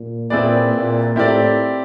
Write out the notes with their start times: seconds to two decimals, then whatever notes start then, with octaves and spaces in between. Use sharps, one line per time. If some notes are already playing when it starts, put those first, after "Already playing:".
Already playing: A#2
0.30 A#2 C4 E4 G#4 B4 D5
0.73 A#2
1.16 A2 C4 E4 G4 A#4 D5